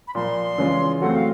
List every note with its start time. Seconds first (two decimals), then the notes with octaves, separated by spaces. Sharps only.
0.08 B5
0.15 A#2 F3 A#3 C6
0.58 C#3 E3 G#3 C#4 F4
1.01 F#3 A3 C4 F#5
1.15 F5